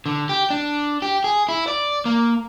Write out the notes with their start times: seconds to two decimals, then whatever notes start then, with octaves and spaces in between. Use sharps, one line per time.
0.06 D3
0.29 G4
0.50 D4
1.02 G4
1.24 G#4
1.49 E4
1.67 D5
2.05 A#3